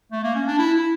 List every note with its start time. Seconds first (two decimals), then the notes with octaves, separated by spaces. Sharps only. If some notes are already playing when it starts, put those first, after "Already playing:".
0.12 A3
0.23 A#3
0.35 C#4
0.47 D4
0.59 E4
0.74 E4